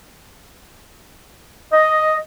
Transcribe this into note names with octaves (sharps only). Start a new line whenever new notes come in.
D#5